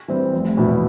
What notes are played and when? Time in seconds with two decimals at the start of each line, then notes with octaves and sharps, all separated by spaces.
0.08 E3 G3 C4
0.33 F1
0.57 E2 B2 B3 E4